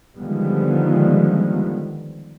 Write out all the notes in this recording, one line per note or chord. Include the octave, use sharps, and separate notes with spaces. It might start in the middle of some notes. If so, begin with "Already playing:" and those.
D3 D#3 F3 G3 G#3 B3